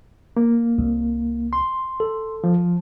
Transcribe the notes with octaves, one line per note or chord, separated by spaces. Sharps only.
A#3
C2
C6
A4
F3